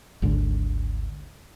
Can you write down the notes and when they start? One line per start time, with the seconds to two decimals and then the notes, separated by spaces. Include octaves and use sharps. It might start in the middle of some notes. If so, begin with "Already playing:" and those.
0.22 G#1 D2 G#2 D3